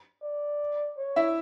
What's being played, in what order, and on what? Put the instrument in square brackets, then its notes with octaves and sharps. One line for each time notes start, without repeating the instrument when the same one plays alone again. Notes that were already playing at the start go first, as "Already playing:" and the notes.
[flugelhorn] D5
C#5
[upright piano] E4 E5